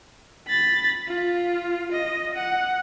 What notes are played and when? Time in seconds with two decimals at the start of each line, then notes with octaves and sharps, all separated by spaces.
0.48 B5 A6
1.07 F4
1.92 D#5
2.35 F#5